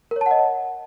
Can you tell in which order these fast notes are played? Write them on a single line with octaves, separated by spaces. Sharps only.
A#4 C#5 A5 F#5 D#5